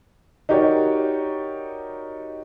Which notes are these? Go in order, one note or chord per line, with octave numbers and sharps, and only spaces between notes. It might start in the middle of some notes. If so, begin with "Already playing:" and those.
D#4 F#4 G4 A#4 C#5 D5